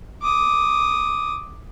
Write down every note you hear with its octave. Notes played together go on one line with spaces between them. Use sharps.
D6 D#6